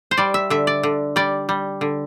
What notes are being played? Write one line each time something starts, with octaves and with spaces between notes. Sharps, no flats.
C5
G3 D5
E5
D3 E5
D5
D3
G3 D5
G3
D3